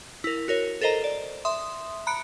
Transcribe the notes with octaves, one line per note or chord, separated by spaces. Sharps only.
E4 A#4
F#4 A#4 C#5
A4 A#4 C5 D#5 A#5
D5
E5 C6 D#6
A#5 B5 F#6 C#7 D7